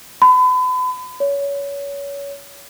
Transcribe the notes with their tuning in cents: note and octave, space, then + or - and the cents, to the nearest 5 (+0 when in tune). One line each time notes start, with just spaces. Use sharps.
B5 +40
C#5 +25